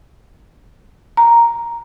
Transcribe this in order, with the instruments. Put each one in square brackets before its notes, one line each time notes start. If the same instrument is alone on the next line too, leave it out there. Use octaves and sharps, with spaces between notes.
[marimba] A#5